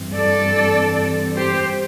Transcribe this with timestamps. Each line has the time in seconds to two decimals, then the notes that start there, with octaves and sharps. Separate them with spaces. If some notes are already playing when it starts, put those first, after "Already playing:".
Already playing: G2 E3 C4
0.14 A4 D5
1.36 G4 C5